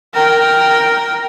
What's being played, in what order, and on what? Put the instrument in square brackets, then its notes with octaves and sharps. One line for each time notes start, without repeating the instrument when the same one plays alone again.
[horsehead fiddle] A#4 G5